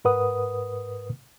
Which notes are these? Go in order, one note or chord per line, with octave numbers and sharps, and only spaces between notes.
G#2 A#4 B4 F#5 D#6